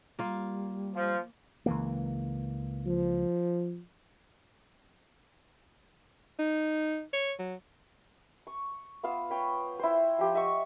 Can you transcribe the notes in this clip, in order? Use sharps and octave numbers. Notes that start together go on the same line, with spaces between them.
G3 A#3 F4
F3
C#2 E3 A#3
F3
D#4
C#5
F#3
C#6
B3 F4 F5 E6
B4 C#5 G5
E4 C5
F3 G4 C5
D#5 E5 F#5 C#6